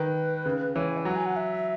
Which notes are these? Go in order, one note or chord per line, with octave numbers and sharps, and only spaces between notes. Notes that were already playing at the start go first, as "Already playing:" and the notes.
Already playing: D#3 B4
C#3
E3 C#5
G#5
F#3 F#5
G#5
F#5
E5